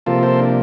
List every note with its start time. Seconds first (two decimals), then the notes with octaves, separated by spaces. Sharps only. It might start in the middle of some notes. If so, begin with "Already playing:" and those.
0.06 C3 F3 A#3 F4 A4
0.23 A4 C5
0.39 D4